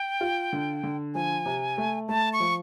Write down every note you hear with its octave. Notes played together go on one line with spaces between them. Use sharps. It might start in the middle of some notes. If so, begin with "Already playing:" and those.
Already playing: G5
F4
D3
D3
F3 G#5
C3
A3
A3 A5
C#6
F3